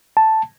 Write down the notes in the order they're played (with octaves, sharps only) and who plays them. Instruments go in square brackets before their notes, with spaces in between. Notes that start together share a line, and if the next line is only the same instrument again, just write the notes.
[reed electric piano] A5